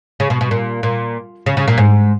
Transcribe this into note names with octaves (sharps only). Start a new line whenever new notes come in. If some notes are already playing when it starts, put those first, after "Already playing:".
C#3
B2
B2
A#2
A#2
C#3
C#3
A#2
G#2